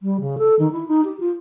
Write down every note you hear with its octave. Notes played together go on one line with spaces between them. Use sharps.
G3
C#3
A4
D#3
E4
D#4
G4
F4